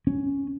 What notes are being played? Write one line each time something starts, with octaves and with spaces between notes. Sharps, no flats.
C#4